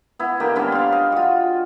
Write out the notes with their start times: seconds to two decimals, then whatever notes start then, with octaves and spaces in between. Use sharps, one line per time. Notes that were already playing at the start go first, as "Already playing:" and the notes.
0.19 B3 E4
0.40 D3 A#3 G4 D#5
0.56 G3 B3 C#4 D4
0.72 F5 C6
0.92 D#5
1.12 F4 F#4